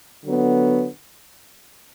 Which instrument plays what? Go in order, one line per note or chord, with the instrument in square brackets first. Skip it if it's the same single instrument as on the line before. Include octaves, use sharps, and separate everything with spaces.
[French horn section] D3 F#3 B3